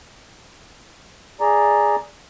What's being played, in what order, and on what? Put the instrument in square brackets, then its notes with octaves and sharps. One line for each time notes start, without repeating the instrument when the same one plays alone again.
[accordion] G#4 D5 A#5